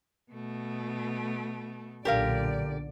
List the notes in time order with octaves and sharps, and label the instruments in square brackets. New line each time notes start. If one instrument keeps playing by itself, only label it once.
[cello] B2 A3
[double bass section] B1 A#2 D3 [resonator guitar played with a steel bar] G4 A#4 F5 [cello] D5